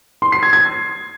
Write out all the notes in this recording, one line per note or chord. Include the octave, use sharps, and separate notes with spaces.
C6
C7
G#6
G#6